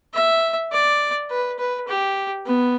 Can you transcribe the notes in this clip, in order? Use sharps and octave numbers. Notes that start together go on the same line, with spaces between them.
E5
D5
B4
B4
G4
B3